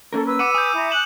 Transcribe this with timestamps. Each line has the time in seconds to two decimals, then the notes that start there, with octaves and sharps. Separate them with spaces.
0.13 A#3 C#4 A4 A#4
0.26 B4 E6
0.39 F#5 D6 C#7 D#7
0.54 G#5 D#6 G6
0.74 E4 E5 A#5
0.91 F#6 E7 F#7